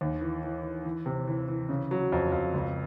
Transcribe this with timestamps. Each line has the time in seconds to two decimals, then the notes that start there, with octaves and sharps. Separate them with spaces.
0.01 D#2
0.21 E3
0.43 E3
0.63 E3
0.85 E3
1.06 C3
1.27 E3
1.48 E3
1.69 C#3
1.91 F#3
2.12 F2
2.32 F2
2.54 C#2